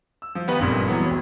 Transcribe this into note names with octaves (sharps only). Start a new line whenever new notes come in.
E6
F3
D#3 B3 D#4 G4 B4
G1 F2 A#2 G3
E3 F#3 G3 B3
D1 F#3